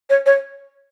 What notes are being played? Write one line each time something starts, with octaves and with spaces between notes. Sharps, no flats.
C#5
C#5